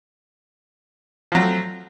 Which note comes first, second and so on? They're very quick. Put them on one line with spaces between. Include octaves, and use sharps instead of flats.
F3 F#3 C4 A3